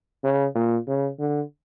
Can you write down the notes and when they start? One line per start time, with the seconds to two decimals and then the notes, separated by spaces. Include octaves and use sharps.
0.24 C#3
0.55 A#2
0.88 C#3
1.20 D3